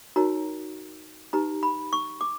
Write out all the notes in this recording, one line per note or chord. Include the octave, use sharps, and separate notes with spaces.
D#4 F#4 A#4 C#5 A#5
D#4 G4 B4 A#5
B5
C#6
D6